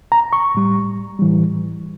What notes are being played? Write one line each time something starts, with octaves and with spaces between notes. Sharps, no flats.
A#5
C#6
A2 G3
A2 E3 G3